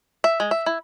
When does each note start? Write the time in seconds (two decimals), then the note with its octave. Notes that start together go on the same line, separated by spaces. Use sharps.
0.24 E5
0.40 G#3
0.51 E5
0.66 E4